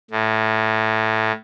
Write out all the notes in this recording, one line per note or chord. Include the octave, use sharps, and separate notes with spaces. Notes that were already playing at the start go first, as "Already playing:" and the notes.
A2